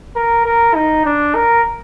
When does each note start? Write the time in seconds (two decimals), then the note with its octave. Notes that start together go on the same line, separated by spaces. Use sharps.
0.16 A#4
0.45 A#4
0.75 D#4
1.05 D4
1.35 A#4